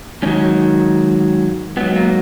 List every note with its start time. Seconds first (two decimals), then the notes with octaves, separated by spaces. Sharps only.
0.22 G#2 D#3 F#3 C#4
1.77 G#2 F#3 B3
1.96 A#3